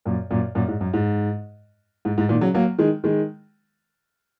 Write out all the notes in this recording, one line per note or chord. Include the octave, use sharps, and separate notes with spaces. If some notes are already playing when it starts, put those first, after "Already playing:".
F#2 A#2
F#2 A#2
F#2 A#2
G#2
F#2
G#2
G#2
G#2
A#2 D#3
C#3 F#3
F#3 A#3
D#3 G#3
D#3 G#3